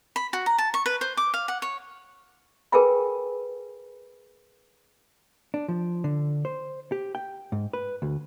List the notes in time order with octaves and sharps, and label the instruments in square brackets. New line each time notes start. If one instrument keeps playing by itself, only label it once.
[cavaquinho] B5
F#4
A#5
A5
C#6
B4
C5
D6
F5
F#5
C#5
[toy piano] G#4 A#4 B4 G5 G#5 B5
[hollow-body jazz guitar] D4
F3
D3
C5
G4
G5
G#2
B4
D2